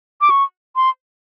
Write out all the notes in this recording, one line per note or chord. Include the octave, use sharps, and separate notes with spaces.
D6
C#6
C6